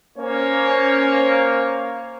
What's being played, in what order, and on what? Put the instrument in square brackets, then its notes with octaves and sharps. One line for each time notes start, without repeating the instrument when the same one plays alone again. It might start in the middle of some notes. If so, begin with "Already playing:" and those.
[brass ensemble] A#3 C#4 C5 C#5